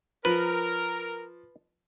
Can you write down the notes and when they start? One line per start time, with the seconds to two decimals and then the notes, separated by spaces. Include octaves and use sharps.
0.25 F3 A#4 B4